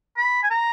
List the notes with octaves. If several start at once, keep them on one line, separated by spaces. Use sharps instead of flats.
B5
G#5
A#5